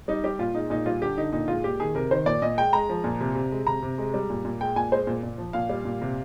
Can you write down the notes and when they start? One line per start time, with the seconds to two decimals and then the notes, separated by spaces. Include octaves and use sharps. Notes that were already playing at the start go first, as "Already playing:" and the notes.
0.08 G3 D#4
0.24 G3 G4
0.39 A#2 F4
0.55 G#3 D#4
0.70 A#2 D#4
0.86 G3 F4
1.02 D3 G4
1.18 D3 D#4
1.33 A#2 D#4
1.48 G#3 F4
1.64 A#2 G4
1.80 D#3 G#4
1.95 C3 A#4
2.11 D#3 C5
2.26 A#2 D5
2.42 A#2 D#5
2.58 G#3 G5
2.73 G#3 A#5
2.89 F3
3.04 A#2
3.21 C3
3.35 C3
3.52 G#3
3.67 C3 A#5
3.82 C3
3.98 G#3
4.14 G3
4.30 A#2
4.45 A#2
4.61 G#3 G5
4.76 A#2 G#5
4.92 G#3 C5
5.07 A#2
5.23 A#2
5.38 F3
5.53 A#2 F5
5.70 G3
5.85 A#2
6.01 C3